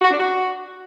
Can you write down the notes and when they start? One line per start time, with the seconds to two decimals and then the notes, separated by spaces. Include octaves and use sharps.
0.01 F#4
0.10 D4
0.19 F#4